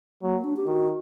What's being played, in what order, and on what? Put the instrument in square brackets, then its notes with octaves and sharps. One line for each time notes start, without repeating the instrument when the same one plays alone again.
[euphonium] F#3 [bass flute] A#3
[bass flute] D4
G4
[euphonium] D#3 [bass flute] F#4